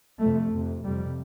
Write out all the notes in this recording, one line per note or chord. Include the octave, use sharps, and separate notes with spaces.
F2 C3 A3
F2 C3
F2 C3 G3